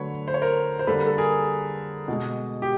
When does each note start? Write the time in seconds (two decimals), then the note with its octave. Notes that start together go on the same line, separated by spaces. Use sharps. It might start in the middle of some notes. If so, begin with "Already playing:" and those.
Already playing: D3 F#3 A3 B4 C#5
0.28 C5
0.34 C#5
0.42 A#4 C5
0.79 C5
0.87 D3 G3 A#3 A4 B4
1.07 A4
1.18 G#4 A#4
2.08 B2 G#3
2.62 G4